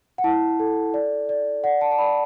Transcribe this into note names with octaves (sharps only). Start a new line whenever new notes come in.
F#5
E4 A5
A4
D5
D5
D5 F#5
A5
A5
D5 B5